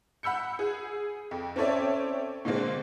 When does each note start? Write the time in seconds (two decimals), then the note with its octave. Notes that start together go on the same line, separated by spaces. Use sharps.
0.23 F#5 B5 E6 G6 C#7
0.59 G#4
1.31 F2
1.56 C4 C#4 A4 C#5 D5 E5
2.45 A#2 D3 G#3 A#3 C4